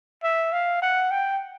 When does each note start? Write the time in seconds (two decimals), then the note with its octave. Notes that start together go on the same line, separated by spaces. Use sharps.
0.23 E5
0.52 F5
0.82 F#5
1.11 G5